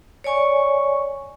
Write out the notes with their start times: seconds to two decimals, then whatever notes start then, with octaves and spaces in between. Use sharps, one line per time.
0.24 C#5 D5 G#5 C#6